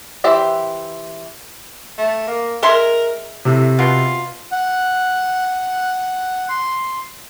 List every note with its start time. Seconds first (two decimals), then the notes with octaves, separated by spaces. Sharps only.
0.24 E3 G4 C5 E5
1.98 A3
2.27 A#3
2.63 G#3 A#4 E5 C6
3.45 A2 C3
3.79 B2 F4
4.51 F#5
6.49 C6